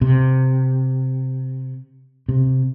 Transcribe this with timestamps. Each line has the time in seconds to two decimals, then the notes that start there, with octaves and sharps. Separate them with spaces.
0.01 C3
2.29 C3